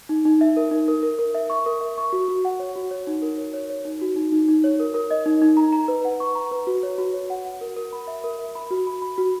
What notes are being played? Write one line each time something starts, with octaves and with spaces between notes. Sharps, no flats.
D#4
D#4
E5
A#4
D#4
A#4
A#4
A#4
E5
C#6
A#4
E5
C#6
F#4
F#4
F#5
C#5
F#4
C#5
D#4
A#4
C#5
C#5
C#5
D#4
F#4
D#4
D#4
D#4
C#5
A#4
A#4
D#5
D#4
D#4
A#5
A#5
B4
F#5
C#6
A#5
B4
F#4
C#5
F#4
C#5
F#5
F#5
A#4
A#4
B5
E5
A#4
E5
B5
F#4
B5
B5
F#4